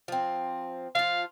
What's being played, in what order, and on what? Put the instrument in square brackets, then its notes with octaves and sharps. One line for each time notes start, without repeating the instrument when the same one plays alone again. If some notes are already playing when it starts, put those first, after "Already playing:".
[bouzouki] F3 C4
[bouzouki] F3 F4 [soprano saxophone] F5